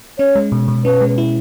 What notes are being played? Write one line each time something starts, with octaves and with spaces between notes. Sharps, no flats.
C#4 C#5
G#3
B2
B2
C#4 B4
G#3
E4